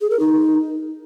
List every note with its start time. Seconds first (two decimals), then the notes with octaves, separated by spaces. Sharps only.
0.01 G#4
0.10 A#4
0.19 D#4